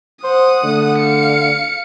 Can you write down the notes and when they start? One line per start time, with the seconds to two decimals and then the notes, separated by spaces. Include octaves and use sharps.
0.24 C5 F#5 D#6
0.64 D3 A3
0.99 F5 C#7